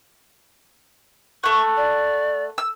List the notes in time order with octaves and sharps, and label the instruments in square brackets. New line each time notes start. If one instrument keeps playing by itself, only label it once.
[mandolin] A3 F#5 [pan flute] C#6
[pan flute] D5
[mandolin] E6